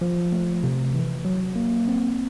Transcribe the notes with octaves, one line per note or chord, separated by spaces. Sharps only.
F3
A3
C3
E3
F#3
A#3
C4